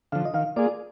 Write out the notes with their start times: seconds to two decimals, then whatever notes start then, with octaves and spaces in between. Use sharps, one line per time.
0.12 D3 F3 F5
0.25 D#5
0.34 D#3 F5
0.56 A#3 F4 G#4 D5